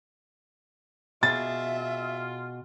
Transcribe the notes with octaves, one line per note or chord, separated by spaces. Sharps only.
B2 F4 G#4 E5 A6